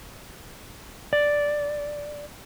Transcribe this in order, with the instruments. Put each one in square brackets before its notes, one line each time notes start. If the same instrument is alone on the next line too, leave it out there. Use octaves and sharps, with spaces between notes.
[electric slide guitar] D5